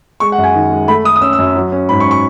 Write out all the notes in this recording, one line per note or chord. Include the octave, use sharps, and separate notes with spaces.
G#3 C#6
F#5
F#2
G#5
D#3
G#3
A3 B5
A3 D#6
D#6
C#4 E6
E6
F#2
F#3
C#4
G#2 B5
C#6
C#4
C#6